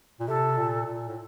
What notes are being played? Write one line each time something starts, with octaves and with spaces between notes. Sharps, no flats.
A#2
C3 A4
A#2
A#2
A2